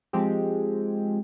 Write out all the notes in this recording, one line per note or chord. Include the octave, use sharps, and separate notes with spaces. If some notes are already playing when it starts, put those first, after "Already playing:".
F3 G#3 C4 G4